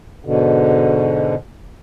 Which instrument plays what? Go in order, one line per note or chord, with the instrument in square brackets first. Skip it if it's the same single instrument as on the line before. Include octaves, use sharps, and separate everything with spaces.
[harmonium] G#2 B2 D3